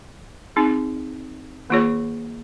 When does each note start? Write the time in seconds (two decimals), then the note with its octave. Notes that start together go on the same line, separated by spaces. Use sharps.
0.56 C4 D#4 G#4
1.70 D#3 A#3 F4 G#4 C#5